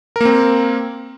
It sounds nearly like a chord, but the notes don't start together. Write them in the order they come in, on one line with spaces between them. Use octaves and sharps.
A#4 A#3 C4